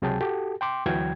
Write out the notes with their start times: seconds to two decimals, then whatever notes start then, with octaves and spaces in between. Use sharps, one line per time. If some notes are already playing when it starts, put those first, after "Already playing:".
0.02 C#2 C3 F#3 G#4 G5 A5
0.21 F#4 G4 A4
0.61 G5 C6 D6
0.86 D2 E3 F#3 F#4 G5 G#6